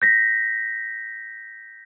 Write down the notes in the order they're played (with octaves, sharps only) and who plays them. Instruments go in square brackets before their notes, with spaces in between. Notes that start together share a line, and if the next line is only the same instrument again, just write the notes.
[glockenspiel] G6 A#6 B6